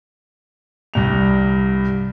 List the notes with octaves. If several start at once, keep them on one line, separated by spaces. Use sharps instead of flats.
C2 G2 F7